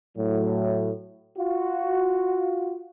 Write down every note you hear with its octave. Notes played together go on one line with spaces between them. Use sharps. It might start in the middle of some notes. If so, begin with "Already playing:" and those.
A2 F#3
F4 F#4